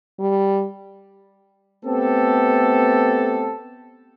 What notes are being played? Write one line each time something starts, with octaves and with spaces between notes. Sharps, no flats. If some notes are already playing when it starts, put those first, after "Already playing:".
G3
A3 B3 C4 G4 A4